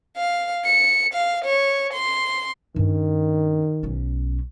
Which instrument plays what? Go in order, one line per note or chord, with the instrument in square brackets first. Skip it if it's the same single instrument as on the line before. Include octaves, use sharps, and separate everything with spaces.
[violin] F5
C#7
F5
C#5
C6
[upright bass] G2 C#4 [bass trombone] D#3
[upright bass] B1 C#4